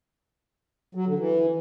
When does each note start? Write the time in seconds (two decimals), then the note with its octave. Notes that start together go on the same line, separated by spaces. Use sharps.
0.95 F#3
1.07 D3
1.19 E3